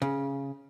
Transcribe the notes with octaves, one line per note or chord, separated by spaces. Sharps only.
C#3